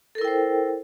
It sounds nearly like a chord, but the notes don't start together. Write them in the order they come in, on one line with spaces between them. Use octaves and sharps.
A4 A#4 E4 G5 C5